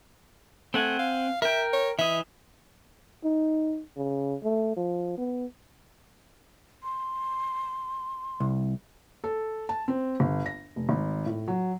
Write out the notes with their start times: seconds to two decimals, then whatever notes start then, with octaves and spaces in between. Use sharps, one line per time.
0.74 A3 C4 F#5 G#5
0.99 F5
1.42 A#4 E5 G5
1.73 C#5
1.99 E3 D#5 E5
3.24 D#4
3.96 C#3
4.43 A3
4.76 F3
5.18 B3
6.83 C6
8.40 C2
9.24 A4
9.69 A5
9.88 C4
10.20 G1
10.46 A#6
10.76 F1
10.89 G#1
11.26 A2
11.48 F#3